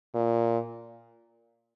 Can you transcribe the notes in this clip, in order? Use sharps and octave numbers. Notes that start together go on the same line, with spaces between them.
A#2